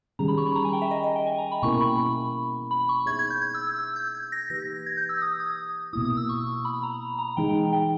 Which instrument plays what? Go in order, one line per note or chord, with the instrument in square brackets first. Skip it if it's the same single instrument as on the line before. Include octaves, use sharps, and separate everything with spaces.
[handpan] D#3 G3 C#4 G#4 [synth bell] A#5
[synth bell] B5
C#6
B5
A#5
G#5
G5
E5
D#5
D#5
G5
G#5
A#5
B5
[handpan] B2 A#3 C#4 E4 A#4 [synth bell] C#6
[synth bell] B5
B5
C#6
[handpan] B3 D#4 G#4 C#5 E5 [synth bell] G#6
[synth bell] G#6
G6
G#6
E6
E6
E6
G6
G#6
A#6
[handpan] E3 A#3 D#4 G4 B4 [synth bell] A#6
[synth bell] G#6
G6
E6
D#6
D#6
[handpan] B2 A#3 E4 [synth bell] D#6
[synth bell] D#6
E6
C#6
B5
A#5
A#5
[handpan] E3 G#3 D#4 G#4 [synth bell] G5
[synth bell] G5
G5